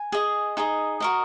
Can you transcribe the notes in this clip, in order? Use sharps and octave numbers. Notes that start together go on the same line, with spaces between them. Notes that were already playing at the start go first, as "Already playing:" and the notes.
Already playing: G#5
G#4 D#5
D#4 G#4 D#5
F#4 A#4 D#5